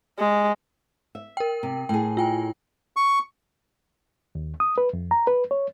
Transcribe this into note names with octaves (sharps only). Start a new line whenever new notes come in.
G#3
E5
A#4 G5
C3
A2 G#4 G5
F4 G5 G#5
C#6
D#2
D#6
B4
F2
A#5
B4
C#5